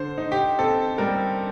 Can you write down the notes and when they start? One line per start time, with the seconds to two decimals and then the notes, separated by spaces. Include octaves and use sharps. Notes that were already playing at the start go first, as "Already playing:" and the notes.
Already playing: D3 C5
0.18 D#4
0.32 G4
0.58 C4 A4
0.98 G3 A#4